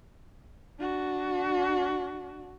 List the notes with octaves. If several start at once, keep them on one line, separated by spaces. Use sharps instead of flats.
D4 F#4